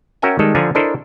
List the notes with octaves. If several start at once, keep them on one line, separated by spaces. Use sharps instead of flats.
C#4 F#4 A#4 E5 G5 G#5
D#3 G3 G#3 A4
D3 F3 D4 G#5 A#5
D4 E4 A4 A#4 C5 D#5